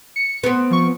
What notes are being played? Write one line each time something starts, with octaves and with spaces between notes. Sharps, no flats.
C#7
B3 C4
F3 C#6